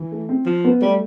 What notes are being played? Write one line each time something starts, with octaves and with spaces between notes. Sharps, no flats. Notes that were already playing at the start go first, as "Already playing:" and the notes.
Already playing: E3
A3
C4
F3
B3
G3 A3